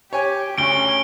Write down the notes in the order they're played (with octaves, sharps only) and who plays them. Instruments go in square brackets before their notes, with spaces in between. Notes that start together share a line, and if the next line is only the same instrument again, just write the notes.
[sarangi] G4 [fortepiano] C#5 G#5
[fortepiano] D2 [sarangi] C#4 [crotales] D7 G7